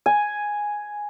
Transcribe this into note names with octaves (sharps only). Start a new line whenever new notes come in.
G#5